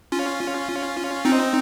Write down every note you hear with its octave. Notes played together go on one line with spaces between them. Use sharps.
C#4 F4
C4 D#4